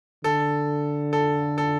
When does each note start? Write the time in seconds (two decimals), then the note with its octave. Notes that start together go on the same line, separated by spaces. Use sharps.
0.24 D3 A4
1.13 A4
1.58 A4